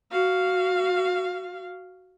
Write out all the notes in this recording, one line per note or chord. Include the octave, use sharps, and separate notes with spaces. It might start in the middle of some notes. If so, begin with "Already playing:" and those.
F#4 F5